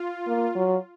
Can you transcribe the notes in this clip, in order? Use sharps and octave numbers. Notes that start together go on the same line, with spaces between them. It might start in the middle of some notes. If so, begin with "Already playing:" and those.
Already playing: F4
A#3
F#3